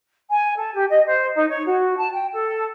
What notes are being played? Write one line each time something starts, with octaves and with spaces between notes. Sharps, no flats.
G#5
A4
G4
D#5
C5
D#4
C#5
F#4
A5
G5
A4